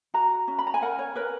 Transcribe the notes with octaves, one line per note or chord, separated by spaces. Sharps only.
F#4 A#5
C#4
B5
A#5
G#5
A#4 F#5
C#5
A#4 B4